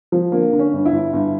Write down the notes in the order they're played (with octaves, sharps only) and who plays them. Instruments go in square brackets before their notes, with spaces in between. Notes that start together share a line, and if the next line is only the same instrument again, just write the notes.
[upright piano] F3
D3 A#3
D3
C#4
G1
E4
G1
G1